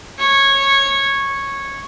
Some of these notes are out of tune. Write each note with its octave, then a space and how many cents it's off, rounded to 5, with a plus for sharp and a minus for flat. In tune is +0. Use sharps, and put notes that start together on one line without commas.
C#5 -15
C#5 -10